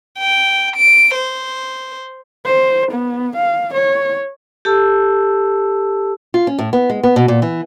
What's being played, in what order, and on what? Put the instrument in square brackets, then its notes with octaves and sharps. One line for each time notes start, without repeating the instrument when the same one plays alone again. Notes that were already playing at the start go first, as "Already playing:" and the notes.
[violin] G5
D7
C5
[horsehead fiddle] C5
B3
F5
C#5
[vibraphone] G4 A4 A5 E6
[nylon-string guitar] F4
C#4
A2
B3
G#3
B3
B2
A#2
E3